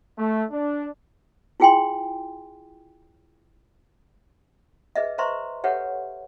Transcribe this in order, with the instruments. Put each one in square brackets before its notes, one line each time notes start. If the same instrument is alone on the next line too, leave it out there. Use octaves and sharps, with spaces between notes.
[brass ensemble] A3
D4
[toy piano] E4 F4 G#4 G5 G#5 C6
G#4 B4 D#5 E5
B4 C5 E5 A#5 C6 C#6
G4 A4 B4 C#5 E5 F#5